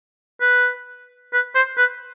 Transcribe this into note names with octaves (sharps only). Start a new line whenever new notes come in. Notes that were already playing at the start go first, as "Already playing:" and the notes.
B4
B4
C5
B4